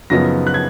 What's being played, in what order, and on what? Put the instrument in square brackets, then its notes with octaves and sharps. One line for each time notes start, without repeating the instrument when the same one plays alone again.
[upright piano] F#2 C#3 F3 B3 D#4 A#6
F#6
G#6